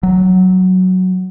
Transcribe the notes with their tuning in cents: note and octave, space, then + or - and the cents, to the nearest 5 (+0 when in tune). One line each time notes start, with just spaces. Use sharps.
F#3 +0